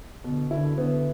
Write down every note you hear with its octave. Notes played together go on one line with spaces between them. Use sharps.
B2 D3
D3 E4
D3 B3